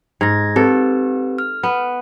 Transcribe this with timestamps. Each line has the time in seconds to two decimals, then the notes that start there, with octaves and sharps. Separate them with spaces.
0.21 G#2 G#6 A#6
0.56 C4 G4 A4 B4
1.39 F6
1.63 B3